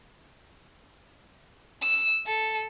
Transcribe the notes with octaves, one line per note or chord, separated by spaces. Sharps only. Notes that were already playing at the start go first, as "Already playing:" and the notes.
E6
A4